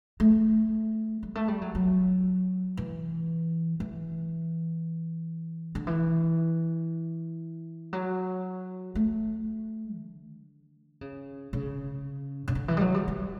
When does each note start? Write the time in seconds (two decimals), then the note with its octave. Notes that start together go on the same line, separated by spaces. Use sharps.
0.20 A3
1.23 G3
1.35 A3
1.48 G3
1.62 F#3
1.75 F#3
2.77 E3
3.80 E3
5.75 D3
5.87 E3
7.93 F#3
8.95 A3
9.98 D3
11.01 C#3
11.53 C#3
12.48 C#3
12.55 D3
12.68 E3
12.77 G3
12.81 F#3
12.94 G3
13.08 G3